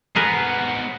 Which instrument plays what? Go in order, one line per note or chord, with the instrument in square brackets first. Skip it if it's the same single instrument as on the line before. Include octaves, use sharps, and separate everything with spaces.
[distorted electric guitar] G#2 B3 [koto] G#4 A#4 B4